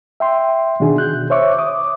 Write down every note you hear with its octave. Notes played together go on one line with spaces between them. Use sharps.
E5 G5 C6
B2 D#3 D4 F#4 G#4
F#6 G6
C5 C#5 E5 C#6 D6
D6 D#6